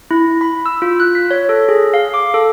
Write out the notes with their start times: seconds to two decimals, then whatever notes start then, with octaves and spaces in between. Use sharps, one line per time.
0.11 E4
0.41 B5
0.66 E6
0.82 F4
1.00 F#6
1.15 B6
1.31 C#5
1.49 A4
1.69 G#4
1.94 F5
2.14 D6
2.34 A4